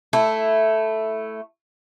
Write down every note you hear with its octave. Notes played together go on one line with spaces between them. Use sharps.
A3 E4